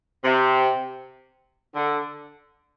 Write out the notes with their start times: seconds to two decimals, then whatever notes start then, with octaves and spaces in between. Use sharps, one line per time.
0.24 C3
1.75 D3